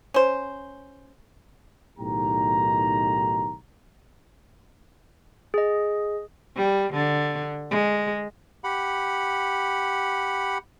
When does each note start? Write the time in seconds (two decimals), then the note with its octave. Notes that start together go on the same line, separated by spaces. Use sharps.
0.14 C#4 C5
1.98 B1 A2 D#3 G4 A#5
5.54 G#4 D#5
6.55 G3
6.93 D3
7.70 G#3
8.64 G4 F#5 B5